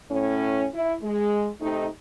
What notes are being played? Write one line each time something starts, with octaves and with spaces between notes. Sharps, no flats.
A2 C#4
E4
G#3
C3 A3 D#4